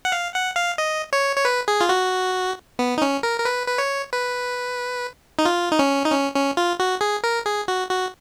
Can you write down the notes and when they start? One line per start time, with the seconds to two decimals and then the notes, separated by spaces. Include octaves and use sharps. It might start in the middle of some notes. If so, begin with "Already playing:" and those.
0.05 F#5
0.12 F5
0.34 F#5
0.56 F5
0.78 D#5
1.13 C#5
1.36 C#5
1.45 B4
1.68 G#4
1.81 F4
1.89 F#4
2.79 B3
2.98 D#4
3.02 C#4
3.23 A#4
3.40 A#4
3.45 B4
3.67 B4
3.78 C#5
4.13 B4
5.39 D#4
5.45 F4
5.72 D#4
5.79 C#4
6.05 D#4
6.12 C#4
6.35 C#4
6.57 F4
6.80 F#4
7.01 G#4
7.24 A#4
7.46 G#4
7.68 F#4
7.91 F#4